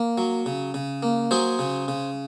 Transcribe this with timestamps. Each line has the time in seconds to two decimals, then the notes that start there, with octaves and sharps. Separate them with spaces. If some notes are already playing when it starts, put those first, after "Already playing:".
Already playing: A#3
0.18 F#3
0.46 C#3
0.74 C#3
1.03 A#3
1.31 F#3 G#4 C5
1.59 C#3
1.88 C#3